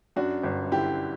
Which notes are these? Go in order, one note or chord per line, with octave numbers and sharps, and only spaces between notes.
F#2 D4 F#4
G1
D3 E4 G4